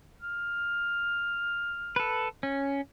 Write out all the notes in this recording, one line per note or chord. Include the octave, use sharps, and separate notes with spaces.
F6
A4 B4
C#4